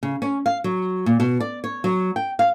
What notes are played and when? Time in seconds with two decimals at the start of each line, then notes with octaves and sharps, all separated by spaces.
0.03 C#3
0.22 C#4
0.46 F5
0.64 F#3
1.06 A#2
1.20 B2
1.40 D5
1.64 C#5
1.84 F#3
2.16 G5
2.39 F5